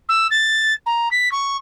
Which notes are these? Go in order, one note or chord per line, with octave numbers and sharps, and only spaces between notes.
E6
A6
A#5
B6
C#6